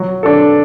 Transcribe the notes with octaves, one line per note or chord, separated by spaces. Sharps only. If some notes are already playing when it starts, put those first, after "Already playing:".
Already playing: F#3
D4 A4